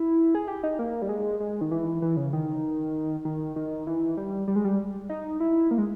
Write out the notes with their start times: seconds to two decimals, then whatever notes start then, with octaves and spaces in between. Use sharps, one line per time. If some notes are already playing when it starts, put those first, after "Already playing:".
Already playing: E4
0.35 G#4
0.48 G4
0.63 D#4
0.79 A#3
1.02 G3
1.09 G#3
1.40 G#3
1.61 D#3
1.71 E3
2.02 E3
2.17 C#3
2.33 D#3
3.25 D#3
3.56 D#3
3.87 E3
4.17 G3
4.48 G3
4.56 G#3
4.64 G3
5.09 D#4
5.40 E4
5.71 A#3
5.78 G#3